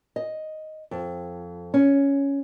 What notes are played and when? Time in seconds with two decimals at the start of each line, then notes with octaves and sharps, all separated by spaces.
0.16 D#5
0.91 F2
1.74 C#4